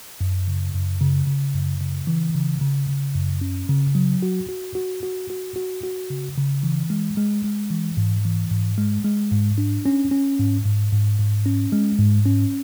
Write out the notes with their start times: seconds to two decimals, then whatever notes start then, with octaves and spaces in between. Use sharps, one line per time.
0.21 F#2
0.48 C#3
0.74 F#2
1.01 C#3
1.27 C#3
1.54 F#2
1.80 C#3
2.07 E3
2.35 C#3
2.61 C#3
2.89 C#3
3.14 F#2
3.41 C#4
3.69 C#3
3.95 F#3
4.22 F#4
4.49 F#4
4.75 F#4
5.03 F#4
5.30 F#4
5.56 F#4
5.83 F#4
6.10 C#3
6.37 C#3
6.63 E3
6.90 G#3
7.17 G#3
7.44 G#3
7.70 E3
7.97 G#2
8.25 E3
8.51 G#2
8.78 G#3
9.05 G#3
9.31 G#2
9.58 D4
9.86 C#4
10.11 C#4
10.39 G#2
10.65 G#2
10.93 G#2
11.19 G#2
11.46 C#4
11.72 G#3
11.99 G#2
12.26 C#4